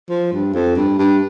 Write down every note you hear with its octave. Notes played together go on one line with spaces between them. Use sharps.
F3
G2
F2
G2
G2